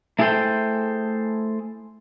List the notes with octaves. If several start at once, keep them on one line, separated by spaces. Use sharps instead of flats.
A3 E4 G#4 A4 C5 G5